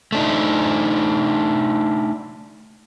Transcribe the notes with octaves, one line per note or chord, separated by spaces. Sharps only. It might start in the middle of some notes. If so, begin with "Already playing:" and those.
A3 D4 D#4